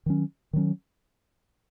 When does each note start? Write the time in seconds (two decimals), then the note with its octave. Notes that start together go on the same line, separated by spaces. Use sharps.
0.06 D#3 F#3 C#4
0.53 D#3 F#3 C#4